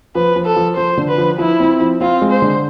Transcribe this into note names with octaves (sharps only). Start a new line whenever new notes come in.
F3 B4
F3
A4
F3
F3 C5
D3
B4
F3
F3 E4
C4
F3
C4 F4
G#3
C5
D3